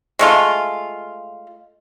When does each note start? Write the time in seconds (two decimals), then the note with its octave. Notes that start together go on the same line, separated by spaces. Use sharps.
0.19 G#3 A3 F4